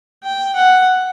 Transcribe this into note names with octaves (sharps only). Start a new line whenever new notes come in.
G5
F#5